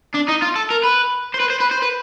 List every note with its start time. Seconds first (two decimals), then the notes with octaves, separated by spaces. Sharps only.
0.14 D4
0.28 D#4
0.42 F4
0.56 A4
0.70 A#4
0.83 B4
1.34 C5
1.40 B4
1.50 C5
1.60 B4
1.71 C5
1.82 B4